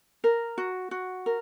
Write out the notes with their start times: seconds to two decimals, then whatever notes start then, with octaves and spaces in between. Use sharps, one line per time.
0.24 A#4
0.58 F#4
0.91 F#4
1.26 A#4